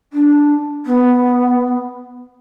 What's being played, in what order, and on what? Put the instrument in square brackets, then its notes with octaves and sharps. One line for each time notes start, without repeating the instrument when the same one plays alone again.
[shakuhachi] D4
B3